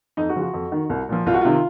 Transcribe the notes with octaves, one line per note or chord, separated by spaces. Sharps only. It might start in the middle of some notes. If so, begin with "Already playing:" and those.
F2 D#4
F#4
C#3 F3
F#4
F2
D#3
C2
A#2 F3
C2 F4
F#4
C3 D#3 F4